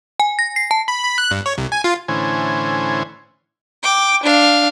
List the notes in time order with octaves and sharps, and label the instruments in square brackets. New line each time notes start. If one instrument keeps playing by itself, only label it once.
[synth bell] G#5
A#6
C7
A5
[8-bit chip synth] B5
B5
F#6
G2
C#5
C2
G#5
F4
[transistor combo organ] A2 D3 E3 C#4 C5 G#5
[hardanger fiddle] G5 D6
D4 F5